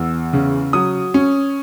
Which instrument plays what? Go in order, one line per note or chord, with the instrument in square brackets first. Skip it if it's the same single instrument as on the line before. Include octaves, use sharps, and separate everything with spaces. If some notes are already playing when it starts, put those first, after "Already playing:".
Already playing: [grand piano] E2 E6
C#3
F#3 D#6
C#4